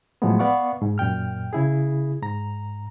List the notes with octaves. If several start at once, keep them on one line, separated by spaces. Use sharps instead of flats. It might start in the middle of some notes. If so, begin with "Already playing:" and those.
A2 F3 F#3 G#3 A3 B3
B3 D5 F5 F#5 C#6
G#2
F#2 A#2 G5 F6
C#3 E4 G#4
G#2 A#5